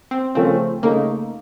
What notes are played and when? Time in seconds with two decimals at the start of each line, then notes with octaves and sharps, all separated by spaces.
0.11 C4
0.35 C#3 F3 A3 C4 C#4
0.83 C#3 A3 A#3 D#4